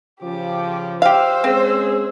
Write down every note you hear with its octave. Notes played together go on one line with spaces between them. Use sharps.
C#3 F3 G4 D6
G4 C5 F5 E6
G#3 C4 C#4 G#4